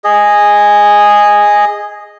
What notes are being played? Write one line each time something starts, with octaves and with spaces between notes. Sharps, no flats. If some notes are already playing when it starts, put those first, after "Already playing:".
G#4 D#5